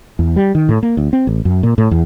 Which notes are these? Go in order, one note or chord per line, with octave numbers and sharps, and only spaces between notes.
E2
G3
D#3
A2
A#3
D2
C4
A1
F#2
A#2
A2
E2